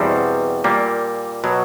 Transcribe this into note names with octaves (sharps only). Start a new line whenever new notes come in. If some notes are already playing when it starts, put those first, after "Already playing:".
Already playing: E2 B2 G3 C4
A#2 G3 A#3
B2 F#3